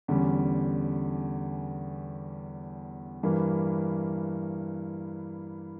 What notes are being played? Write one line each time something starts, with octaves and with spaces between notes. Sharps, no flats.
E2 D3 G3 C#4
G2 E3 A#3